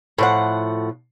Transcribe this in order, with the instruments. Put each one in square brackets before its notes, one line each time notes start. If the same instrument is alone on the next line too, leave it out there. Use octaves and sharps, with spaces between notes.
[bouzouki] A2 F3 F#5